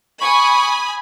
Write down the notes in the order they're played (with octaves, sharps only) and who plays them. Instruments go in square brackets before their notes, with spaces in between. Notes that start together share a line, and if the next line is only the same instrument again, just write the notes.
[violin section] G#5 B5 D#6 [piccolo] C#6